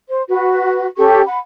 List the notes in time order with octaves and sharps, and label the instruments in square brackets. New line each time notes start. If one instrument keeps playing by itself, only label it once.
[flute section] C5
F#4 B4
C#4 G4 A4 C#6
F#5 B5